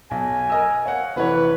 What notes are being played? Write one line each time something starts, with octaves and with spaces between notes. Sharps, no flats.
B1 G#5
A#4 D#5 E6
C#5 F5 F#5
F1 E3 B4 C#5